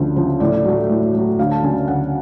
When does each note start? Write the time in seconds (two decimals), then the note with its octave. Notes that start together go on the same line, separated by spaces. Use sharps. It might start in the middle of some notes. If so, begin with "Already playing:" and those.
Already playing: D2 C#3 F3
0.16 C#3 F3
0.40 A2 D5
0.64 F#3 A3
0.89 A2
1.14 F#3 A3
1.39 D2 F5
1.52 A5
1.63 C#3 F#3 G#5
1.88 D2 F#5